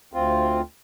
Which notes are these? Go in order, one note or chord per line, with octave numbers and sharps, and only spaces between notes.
D2 C4 F4